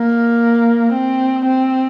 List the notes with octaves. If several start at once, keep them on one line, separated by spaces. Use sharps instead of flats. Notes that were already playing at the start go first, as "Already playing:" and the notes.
Already playing: A#3
C4
C4